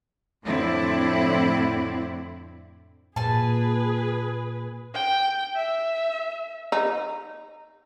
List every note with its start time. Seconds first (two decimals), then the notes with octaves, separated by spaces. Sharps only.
0.43 F2 A2 D3 C4 E4
3.16 A#2 G#4 B4 G#5 A5
4.94 G5
5.56 E5
6.72 D#4